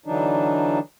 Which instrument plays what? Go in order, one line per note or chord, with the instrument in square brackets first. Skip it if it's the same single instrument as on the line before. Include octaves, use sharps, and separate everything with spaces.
[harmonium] D3 E3 F#3 D4 D#4